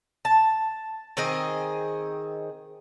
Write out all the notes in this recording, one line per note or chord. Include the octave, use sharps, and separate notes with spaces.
A5
D#3 C4 G#4 D#5